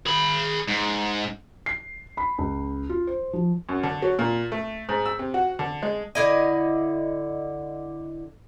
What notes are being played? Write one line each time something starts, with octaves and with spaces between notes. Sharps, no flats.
G#4 B5
G#2
C7
B5
C#2
F4
C5
F3
F#2
D3
F#3
A#2
A3
G#2
E6
C3
F#4
D3
G#3
D3 E4 D#5